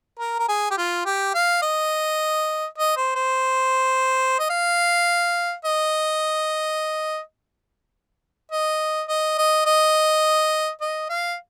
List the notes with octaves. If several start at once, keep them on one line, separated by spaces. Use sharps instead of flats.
A#4
A#4
G#4
G4
F4
G4
F5
D#5
D#5
C5
C5
D#5
F5
D#5
D#5
D#5
D#5
D#5
D#5
F5